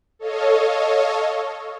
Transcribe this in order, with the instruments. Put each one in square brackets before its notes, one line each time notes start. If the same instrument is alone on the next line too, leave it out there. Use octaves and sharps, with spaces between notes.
[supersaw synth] A4 C#5 D#5 F5